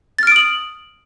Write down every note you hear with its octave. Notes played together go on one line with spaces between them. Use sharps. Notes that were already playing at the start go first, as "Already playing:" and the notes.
D#6 F6 A6 D7 F#7